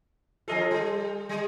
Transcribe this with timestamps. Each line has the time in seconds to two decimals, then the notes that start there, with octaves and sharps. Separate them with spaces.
0.48 F3 F4 A4 D#5 G#5
0.71 G3
1.29 G3